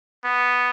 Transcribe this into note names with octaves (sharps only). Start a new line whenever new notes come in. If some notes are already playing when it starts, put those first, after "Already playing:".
B3